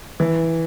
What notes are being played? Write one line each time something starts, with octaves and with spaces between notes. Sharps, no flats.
E3